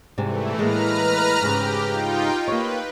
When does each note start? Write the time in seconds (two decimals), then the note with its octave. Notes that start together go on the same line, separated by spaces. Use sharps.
0.18 G#2 C3 E3 G3 A3
0.58 A2 G#3 A#3 B4 A#5 F6
1.42 G#2 C#3 G4
1.85 D#4 F4 G5
2.48 A#3 B4 C#5